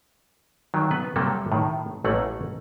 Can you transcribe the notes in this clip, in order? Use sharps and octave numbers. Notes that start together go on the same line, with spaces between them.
D#3 F#3
B3 B4
C3 F#3 G3 A#3 A4
A2 D#3
A1 A3 A#3 F#5